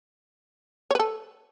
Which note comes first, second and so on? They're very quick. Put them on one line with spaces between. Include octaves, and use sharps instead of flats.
C#5 B4 A4